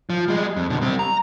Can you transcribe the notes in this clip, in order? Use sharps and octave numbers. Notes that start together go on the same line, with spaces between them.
F3
G3 G#3
F2
B2 D3
G3 C4
A#5